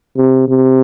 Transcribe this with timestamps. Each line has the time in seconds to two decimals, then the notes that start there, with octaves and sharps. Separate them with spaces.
0.17 C3
0.48 C3